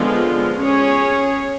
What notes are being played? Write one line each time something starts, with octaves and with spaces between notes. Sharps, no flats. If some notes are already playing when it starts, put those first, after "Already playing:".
Already playing: D3 F3 G#3 B3 F4
C#4 G#4 C#5